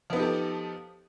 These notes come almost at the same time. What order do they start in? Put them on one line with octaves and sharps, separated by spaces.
F3 B3 D#4 G4 A4